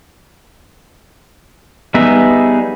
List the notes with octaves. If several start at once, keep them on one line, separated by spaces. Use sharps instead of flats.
G3 B3 D#4 G#4 E5